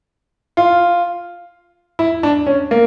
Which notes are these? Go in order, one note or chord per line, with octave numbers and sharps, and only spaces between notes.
F4
E4
D4
C#4
A#3